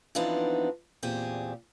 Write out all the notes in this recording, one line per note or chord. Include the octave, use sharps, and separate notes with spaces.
E3 F3 B3 C4 D4 D#4
E2 A#2 C4 G4 G#4 G#5